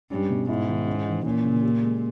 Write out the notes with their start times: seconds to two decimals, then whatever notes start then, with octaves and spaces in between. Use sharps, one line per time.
0.11 G2 C#4
0.30 B2
0.49 G#2 E4
0.68 D#3
0.87 C#4
1.06 E3
1.25 A#2 C#4
1.44 C#3
1.62 G4
1.82 G#3